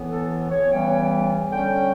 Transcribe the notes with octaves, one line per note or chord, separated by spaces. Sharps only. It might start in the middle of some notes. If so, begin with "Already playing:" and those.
Already playing: A2 E3 B3
A4
C#5
C#3 E3 G3 B3 G5
D3 G3 C#4 G5